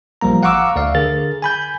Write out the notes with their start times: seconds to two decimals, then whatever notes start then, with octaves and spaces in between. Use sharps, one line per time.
0.21 A1 F3 G3 A#3 A#5
0.43 F5 F#5 A#5 C#6 D6 E6
0.76 D2 D5 F5
0.95 D3 G#4 A#4 A6
1.42 G#5 B5 G6